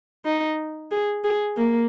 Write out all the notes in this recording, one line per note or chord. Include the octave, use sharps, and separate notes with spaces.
D#4
G#4
G#4
A#3